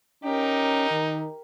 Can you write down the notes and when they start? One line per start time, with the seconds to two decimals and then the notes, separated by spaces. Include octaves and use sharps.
0.24 C#4 D#4 G4 A#4
0.90 D#3